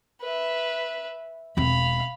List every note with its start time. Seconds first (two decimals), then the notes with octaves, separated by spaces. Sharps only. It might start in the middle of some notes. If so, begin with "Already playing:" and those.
0.21 B4 E5
1.57 E1 C4 F5 B5